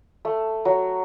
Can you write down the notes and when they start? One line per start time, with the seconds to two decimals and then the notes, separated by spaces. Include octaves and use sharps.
0.25 A3
0.65 F#3